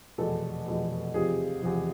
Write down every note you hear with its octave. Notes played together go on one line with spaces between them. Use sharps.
F1 E2 B2 B3 A4
F1 E2 B2 B3
E2 C3 F3 G#4
E2 C3 F3